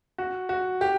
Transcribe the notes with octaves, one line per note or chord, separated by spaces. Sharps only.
F#4
F#4
G4